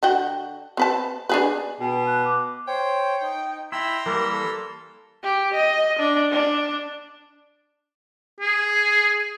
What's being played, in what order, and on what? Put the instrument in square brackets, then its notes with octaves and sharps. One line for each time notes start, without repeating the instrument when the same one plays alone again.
[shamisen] D3 F#4 G5
C4 B4 A5
D4 G#4 B4
[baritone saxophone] B2 [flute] G5
[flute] F#6
D6
[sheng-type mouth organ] C5 C#5 [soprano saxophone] G5
[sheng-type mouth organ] D#4
[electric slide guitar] E4 [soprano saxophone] G5 [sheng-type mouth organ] A#5 C6 E6
[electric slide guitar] E3 G3 A#3 [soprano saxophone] A#4
[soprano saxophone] A4
[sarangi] G4
D#5
D4
D4
[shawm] G#4